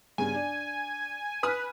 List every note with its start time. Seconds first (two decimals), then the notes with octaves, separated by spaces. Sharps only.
0.18 G2 C#3 B3 G#5
0.34 D4
1.43 B4 G#5 D#6 F6